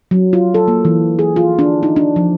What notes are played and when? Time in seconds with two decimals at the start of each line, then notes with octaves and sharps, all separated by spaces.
0.11 F#3
0.33 F4
0.54 A4
0.68 A#3
0.85 E3
1.19 G#4
1.36 F4
1.59 D4
1.83 D#4
1.96 D4
2.16 F3